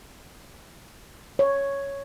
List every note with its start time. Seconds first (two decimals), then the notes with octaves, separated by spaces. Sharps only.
1.39 C#5